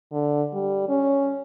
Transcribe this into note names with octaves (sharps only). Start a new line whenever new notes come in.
D3
G3
C#4